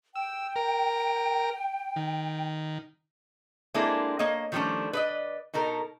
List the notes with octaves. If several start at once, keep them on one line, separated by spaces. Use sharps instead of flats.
G5 E6
A#4
D#3
G#3 A#3 C4 D4 E4 A4
A#3 C#5 D#5
D#3 F3 G3 A3 C#4 D4
B4 D5 D#5
B2 D#4 A4 A#4